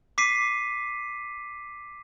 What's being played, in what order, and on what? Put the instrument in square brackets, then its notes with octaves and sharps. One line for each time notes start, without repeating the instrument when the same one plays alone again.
[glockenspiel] D6 B6 C7 D#7